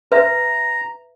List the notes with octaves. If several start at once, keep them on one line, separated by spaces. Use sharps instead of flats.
B4 E5 A#5